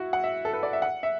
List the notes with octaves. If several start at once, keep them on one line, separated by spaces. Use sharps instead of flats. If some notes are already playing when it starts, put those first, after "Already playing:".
Already playing: E4 F#4
F#5
E5
A4
B4
D5
E5
F#5
E5